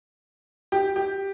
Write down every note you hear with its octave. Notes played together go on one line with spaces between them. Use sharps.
G4
G4